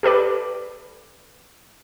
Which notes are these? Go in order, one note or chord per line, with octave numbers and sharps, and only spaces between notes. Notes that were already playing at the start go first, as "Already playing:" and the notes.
G4 A4 B4 D5